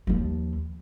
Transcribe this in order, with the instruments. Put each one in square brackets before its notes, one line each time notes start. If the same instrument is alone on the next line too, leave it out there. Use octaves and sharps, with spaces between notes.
[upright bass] D#2 F3